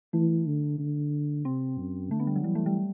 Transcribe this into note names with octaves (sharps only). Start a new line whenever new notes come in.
E3 A3
D3
D3
C3 C4
F#2
D3 A3
B3
G3
F#3
E3 G3
A3
G3